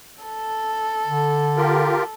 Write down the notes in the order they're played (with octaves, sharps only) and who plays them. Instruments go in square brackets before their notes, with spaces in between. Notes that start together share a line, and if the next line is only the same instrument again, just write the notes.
[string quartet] A4
[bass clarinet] D3
[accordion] F4 G4 A#4